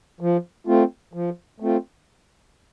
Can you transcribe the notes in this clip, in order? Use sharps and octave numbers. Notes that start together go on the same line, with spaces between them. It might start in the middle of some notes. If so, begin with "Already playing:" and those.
F3
A3 C4 F4
F3
A3 C4 F4